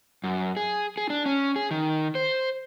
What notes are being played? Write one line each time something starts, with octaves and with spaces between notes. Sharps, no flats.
F#2
G#4
G#4
D4
C#4
G#4
D#3
C5